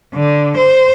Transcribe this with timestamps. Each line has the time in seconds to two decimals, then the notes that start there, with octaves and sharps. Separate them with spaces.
0.14 D3
0.57 C5